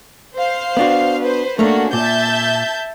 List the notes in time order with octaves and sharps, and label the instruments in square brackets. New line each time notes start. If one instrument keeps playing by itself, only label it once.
[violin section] C5 F5
[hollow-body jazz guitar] B3 D4 F#4
[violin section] B4 C5
[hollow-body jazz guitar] A3 A#3 [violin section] C#4 D4 F#4
[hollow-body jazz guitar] A#2 [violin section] E5 A5 G6